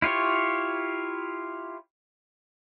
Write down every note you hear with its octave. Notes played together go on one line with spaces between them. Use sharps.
E4 F4 G4 C#5